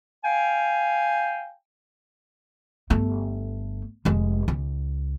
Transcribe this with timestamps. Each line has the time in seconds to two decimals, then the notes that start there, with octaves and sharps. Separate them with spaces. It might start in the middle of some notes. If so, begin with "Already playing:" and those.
0.24 F5 G5 G#5
2.90 G1 A3
4.05 F1 G#3
4.48 C#2